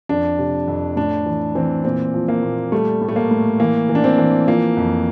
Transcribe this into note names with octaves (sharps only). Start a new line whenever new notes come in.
F2 D4
C3
F2
A2 D4
E3
E3 C4
A#2 C4
F3
A#3
A#2
G3 A3
A2
A3
A#3
A2
E3 A#3
E3
D4
C4
E3
F3 A#3
F2